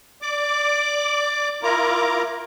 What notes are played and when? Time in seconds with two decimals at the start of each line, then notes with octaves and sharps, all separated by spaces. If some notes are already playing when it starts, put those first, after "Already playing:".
0.22 D5 D6
1.63 E4 F4 A#4 A#5 D6